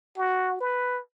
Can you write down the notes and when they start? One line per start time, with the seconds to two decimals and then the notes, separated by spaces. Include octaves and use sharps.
0.18 F#4
0.61 B4